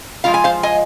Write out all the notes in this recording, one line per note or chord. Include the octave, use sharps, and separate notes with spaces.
F3 G#3 F4 F5
G#5
C5 F5
D#5 G#5